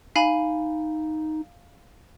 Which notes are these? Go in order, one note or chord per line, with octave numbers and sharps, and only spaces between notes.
D#4 F5 G#5 B5